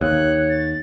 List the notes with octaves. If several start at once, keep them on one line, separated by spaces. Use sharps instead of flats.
D#2 C#5 F#6
A6